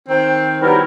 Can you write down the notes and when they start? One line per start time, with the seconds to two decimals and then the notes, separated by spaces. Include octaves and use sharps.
0.09 D#3 C4
0.63 D#3 F#3 G3 B3 E4 A#4